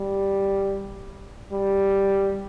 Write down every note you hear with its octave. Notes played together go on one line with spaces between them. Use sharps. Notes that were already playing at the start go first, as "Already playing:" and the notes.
Already playing: G3
G3